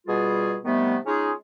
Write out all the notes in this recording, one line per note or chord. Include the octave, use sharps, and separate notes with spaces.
B2 G3 F4 G#4
C3 D#3 G3 A3 B3
G#3 C#4 D#4 F4 G#4